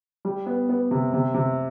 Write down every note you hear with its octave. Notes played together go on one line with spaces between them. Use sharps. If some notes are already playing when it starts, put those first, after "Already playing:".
G3
B3
B3
C3
C3
C3